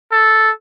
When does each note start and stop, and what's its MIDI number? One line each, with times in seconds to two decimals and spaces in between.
0.12 0.52 69